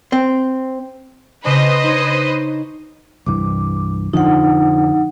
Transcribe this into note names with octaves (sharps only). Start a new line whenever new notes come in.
C4
C#3 D4 B4 C5 D#5
D#4 C#5
C2 G2 E3 D6
F2 D3 F3 D#4 F#5